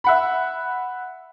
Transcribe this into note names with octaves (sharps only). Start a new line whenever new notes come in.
E5 F#5 B5